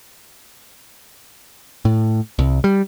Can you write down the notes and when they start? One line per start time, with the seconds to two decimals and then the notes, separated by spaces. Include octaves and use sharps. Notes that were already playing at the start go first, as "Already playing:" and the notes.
1.85 A2
2.39 C2
2.64 G3